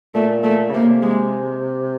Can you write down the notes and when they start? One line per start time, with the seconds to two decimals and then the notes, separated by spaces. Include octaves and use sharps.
0.14 A#2 A3
0.43 A3
0.69 C#3
0.74 C3 A#3
1.02 G#3